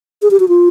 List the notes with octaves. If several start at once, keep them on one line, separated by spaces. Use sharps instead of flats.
G#4
G4
F#4
F4